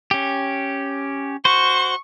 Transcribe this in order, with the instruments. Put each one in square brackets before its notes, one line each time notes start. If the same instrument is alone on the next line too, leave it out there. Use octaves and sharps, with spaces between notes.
[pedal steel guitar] C#4 G4
[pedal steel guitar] F#4 C5 [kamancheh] C#6